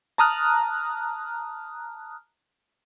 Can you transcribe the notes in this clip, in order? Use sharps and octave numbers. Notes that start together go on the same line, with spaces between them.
A5 A#5 D#6 F6 F#6